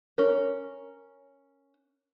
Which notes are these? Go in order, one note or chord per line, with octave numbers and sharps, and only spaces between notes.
C#4 A#4